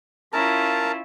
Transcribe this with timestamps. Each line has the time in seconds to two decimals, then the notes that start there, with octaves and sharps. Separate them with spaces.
0.33 C#4 E4 F4 A#4 A5 A#5